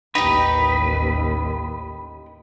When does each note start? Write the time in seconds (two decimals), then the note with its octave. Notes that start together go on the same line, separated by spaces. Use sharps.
0.15 A1 D#2 D#4 G4 B4